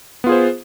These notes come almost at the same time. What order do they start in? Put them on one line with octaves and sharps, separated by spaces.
B3 F4 G#4 C5